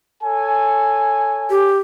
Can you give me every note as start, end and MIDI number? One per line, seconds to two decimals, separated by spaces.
0.23 1.72 69
0.23 1.72 73
0.23 1.72 80
1.50 1.78 67